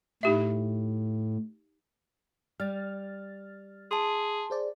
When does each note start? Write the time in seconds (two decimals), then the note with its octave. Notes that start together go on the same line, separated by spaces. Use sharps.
0.23 A2 D#4 G4 E5
2.60 G3 F6 A6
3.91 G#4 A5 C6
4.50 G#4 C5 D5